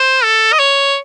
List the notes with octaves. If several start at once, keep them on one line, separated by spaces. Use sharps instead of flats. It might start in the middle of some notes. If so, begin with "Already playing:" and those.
Already playing: C5
A4
D#5
C#5